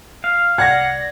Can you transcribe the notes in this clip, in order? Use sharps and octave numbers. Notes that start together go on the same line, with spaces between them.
F5
C2 D5 F#5 G#6 A#6